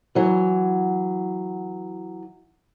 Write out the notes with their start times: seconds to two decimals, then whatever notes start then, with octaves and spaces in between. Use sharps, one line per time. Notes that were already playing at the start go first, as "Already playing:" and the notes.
0.15 E3 F#3